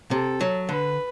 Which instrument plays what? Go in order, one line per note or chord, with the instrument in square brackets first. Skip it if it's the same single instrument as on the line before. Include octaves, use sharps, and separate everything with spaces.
[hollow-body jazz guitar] C3 [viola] A4
[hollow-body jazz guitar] F#3
[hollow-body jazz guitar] D3 [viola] B4